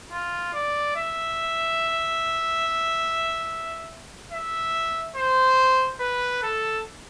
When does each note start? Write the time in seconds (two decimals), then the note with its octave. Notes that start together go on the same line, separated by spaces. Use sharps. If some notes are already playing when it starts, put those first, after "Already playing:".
0.12 F4
0.53 D5
0.96 E5
4.32 E5
5.16 C5
6.00 B4
6.42 A4